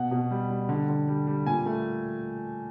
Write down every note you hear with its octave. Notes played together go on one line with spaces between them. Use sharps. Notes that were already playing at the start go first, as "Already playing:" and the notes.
Already playing: B2 F#5
B2
G3
G3
D3
D3
G3
G3
A#2 G#5
A3